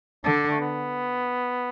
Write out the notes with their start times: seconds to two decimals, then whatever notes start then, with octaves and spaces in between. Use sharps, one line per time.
0.24 D3 D4
0.51 A3
0.60 B3